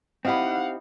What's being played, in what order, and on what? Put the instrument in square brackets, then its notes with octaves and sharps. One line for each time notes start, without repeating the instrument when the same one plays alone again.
[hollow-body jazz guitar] C4 G4 [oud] D#4 E4 B4 [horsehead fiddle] F5 F#5